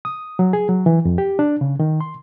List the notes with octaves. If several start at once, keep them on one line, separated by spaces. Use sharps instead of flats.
D#6
F#3
G#4
F#3
E3
F2
G4
D4
C#3
D#3
C6